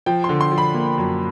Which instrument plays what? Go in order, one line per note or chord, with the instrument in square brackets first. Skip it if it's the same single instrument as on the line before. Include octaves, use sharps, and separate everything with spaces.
[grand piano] F3 G5
C6
D3
C6
F3
B5
A#3
F#2